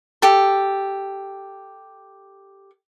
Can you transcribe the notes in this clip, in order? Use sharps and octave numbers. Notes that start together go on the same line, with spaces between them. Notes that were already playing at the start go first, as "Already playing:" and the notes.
G4 A4